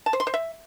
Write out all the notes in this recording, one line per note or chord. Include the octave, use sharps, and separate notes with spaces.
A5
C5
C6
C5
E5